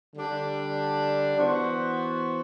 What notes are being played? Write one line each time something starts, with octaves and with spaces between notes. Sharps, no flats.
D3 G3 D4
E3 B3 F#4 C5